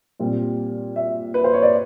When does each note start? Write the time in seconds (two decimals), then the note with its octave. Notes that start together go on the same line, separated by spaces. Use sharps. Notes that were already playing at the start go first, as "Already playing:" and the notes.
0.20 A#2 G3 C4
0.96 E5
1.34 B4
1.44 C5
1.53 C#5
1.62 D5